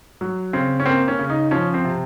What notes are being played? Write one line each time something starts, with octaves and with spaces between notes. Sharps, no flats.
F#3
C#3 C4
C#4
A#3 C4
C#4
C#3
D#4
F3 C#4
C4
C3